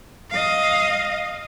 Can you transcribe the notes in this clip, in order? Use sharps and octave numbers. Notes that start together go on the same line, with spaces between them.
D#5 F5